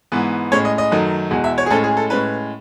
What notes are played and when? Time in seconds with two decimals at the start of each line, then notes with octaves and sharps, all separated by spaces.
0.12 G#2 E3 B3
0.52 A2 G#3 C#4 C#5
0.65 D#5
0.78 D#5
0.91 F#2 D#3 F#3 A3
1.31 E2 B2 G#3
1.44 E5
1.58 C#5
1.66 G#4
1.70 A2 G#3 C#4 A4
1.84 G#4
1.97 A4
2.10 A2 G#3 C#4 B4